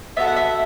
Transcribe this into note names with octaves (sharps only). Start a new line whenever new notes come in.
B3 D4 F#4 A4 E5
F#5
E5